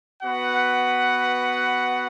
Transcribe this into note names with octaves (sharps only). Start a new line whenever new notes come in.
B3 F#4 B4 F#5